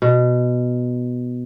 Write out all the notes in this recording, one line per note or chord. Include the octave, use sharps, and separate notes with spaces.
B2